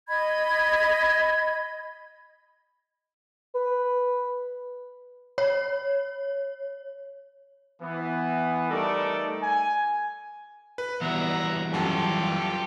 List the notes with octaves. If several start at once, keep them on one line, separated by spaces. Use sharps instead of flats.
D#5 B5 G#6
B4
C#5
E3 B3
G3 A3 D#4 A4 A#4 D5
G#5
B4
E3 G3 B3 F#4 E5 F#5 A#5
F#2 F#3 F4 G4 A4